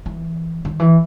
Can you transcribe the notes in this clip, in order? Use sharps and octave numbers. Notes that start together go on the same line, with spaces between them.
E3
D#3
E3